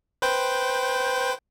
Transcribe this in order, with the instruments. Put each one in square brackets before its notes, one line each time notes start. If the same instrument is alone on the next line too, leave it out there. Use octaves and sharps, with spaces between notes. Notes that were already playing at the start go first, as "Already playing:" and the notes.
[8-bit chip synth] B4 C5 G5